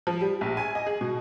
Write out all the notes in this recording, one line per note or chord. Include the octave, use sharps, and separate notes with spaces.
F3
G3
A#1
G#5
D#5
G#4
B2